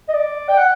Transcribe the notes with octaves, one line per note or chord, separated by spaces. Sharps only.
D#5
D5
G5
F#5